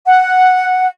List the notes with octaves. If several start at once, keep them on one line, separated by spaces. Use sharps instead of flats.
F#5